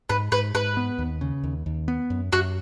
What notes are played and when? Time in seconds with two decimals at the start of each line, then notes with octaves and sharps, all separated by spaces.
0.09 G#2 B4
0.32 G#2 B4
0.54 G#2 B4
0.77 B3
0.98 D#2
1.21 C#3
1.44 D#2
1.66 D#2
1.88 B3
2.10 F#2
2.33 F#2 F#4